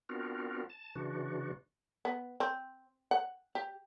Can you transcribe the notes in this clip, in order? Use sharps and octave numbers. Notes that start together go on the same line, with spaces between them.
B3 C4 D4 F4 F#4 A#4
A5
C#3 E3 D4 F#4
B3
C4
F#5
G4